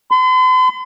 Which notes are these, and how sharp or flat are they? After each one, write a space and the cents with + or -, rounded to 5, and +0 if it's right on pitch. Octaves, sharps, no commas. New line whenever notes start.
C6 -45